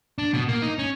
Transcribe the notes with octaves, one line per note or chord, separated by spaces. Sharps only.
D4
B2
A#3
D#4
C#4